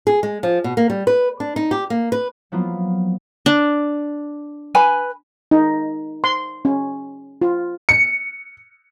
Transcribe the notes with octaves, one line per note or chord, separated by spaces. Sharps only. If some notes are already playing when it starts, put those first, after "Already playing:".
G#4
G#3
F3
B2
A#3
G3
B4
D4
D#4
G4
A#3
B4
F3 F#3 A#3 B3 E4 F4
D4
B4 G#5 B5
D#4
C6
C#4
F4
C#7